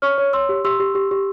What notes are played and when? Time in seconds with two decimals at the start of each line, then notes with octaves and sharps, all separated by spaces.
0.02 C#5 C#6 F6
0.18 C#5
0.33 C#5 C6 E6
0.49 G4
0.65 G4 C6 E6
0.80 G4
0.95 G4
1.11 G4